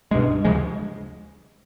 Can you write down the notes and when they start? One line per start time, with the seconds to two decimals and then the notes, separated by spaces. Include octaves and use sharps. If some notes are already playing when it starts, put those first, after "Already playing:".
0.11 C#2 G2 B2 G#3
0.45 D2 C#3 F3 G#3